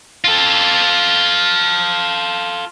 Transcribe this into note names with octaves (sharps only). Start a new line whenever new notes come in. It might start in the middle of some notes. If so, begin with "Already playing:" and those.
F4 A4